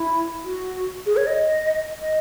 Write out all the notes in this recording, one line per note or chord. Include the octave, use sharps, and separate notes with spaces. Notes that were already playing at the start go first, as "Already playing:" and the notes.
Already playing: E4
F#4
G#4
C#5
D#5
D#5